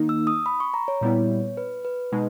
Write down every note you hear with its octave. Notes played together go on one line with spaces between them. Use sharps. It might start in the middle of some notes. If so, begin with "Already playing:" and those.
Already playing: D#3 A#3 D#4
E6
D#6
B5
C#6
A#5
C#5
A#2 G3 B3 E4
B4
B4
B2 G#3 D#4